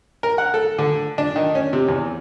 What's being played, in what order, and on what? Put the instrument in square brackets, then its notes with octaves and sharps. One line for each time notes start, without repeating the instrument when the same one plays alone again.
[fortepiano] A#4
F#5
A4
D3
D4
D#3
C#4
C3
E2